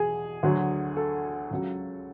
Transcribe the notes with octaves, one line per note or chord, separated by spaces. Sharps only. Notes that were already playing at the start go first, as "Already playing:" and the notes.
Already playing: E2 B2 G#4
D2 D3 F#3
A4
C#2 C#3 F#3